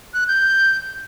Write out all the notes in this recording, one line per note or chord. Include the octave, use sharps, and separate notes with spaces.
F#6
G6